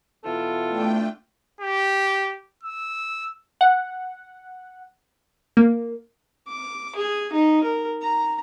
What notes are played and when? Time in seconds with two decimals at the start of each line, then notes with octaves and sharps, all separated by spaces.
0.24 B2 E3 B3 F4 A4
0.67 A3 D4 G5
1.61 G4
2.63 E6
3.61 F#5
5.57 A#3
6.48 D6
6.96 G#4
7.33 D#4
7.64 A#4
8.02 A#5